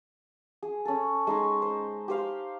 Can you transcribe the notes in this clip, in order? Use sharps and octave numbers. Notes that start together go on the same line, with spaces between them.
G#4
C#4 A4
G#3 D#4 C#6
C5
G4 C5 F5